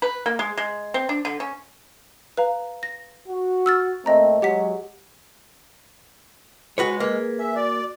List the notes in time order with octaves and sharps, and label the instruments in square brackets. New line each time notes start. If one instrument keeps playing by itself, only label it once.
[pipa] B4
A#3
G#3
G#3
C4
D4
D3
C#4
[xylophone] B4 F5 A#5
A#6
[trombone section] F#4
[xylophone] E6 F6 A6
[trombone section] A#2 A3 C4 [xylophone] D#5 A#5
[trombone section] F#3 G#3 [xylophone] G4 F#5 B6
[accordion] G#3 [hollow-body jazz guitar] F#4 B4 C#5
[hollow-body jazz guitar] A#3 [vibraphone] G#4 B4
[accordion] E5 [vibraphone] G#5
[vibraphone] F#4 [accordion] D5